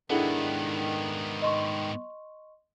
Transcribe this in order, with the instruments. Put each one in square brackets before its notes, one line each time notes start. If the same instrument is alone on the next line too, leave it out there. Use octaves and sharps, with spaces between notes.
[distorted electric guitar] G#2 B3 [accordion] D#3 [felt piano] D4 E4 [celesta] G#4 A4 F#5
[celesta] D#5 C6 C#6